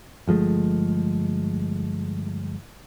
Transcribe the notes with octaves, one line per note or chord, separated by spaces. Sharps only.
G1 F3 G#3 A3